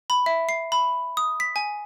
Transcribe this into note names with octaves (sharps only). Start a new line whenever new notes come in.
B5
E5
C7
B5
D#6
B6
G#5